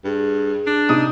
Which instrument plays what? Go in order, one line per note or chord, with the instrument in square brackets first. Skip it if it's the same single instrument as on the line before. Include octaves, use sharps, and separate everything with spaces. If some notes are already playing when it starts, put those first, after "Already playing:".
[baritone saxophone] G2 [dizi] G#4
[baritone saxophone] D4
[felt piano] C3 D#4 D#6